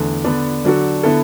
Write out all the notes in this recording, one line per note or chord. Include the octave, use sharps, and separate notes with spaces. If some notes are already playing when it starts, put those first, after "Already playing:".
Already playing: E2 D3 A3
D3 B3 D4
D3 F#3 D4 F#4 A4
D3 B3 E4 A4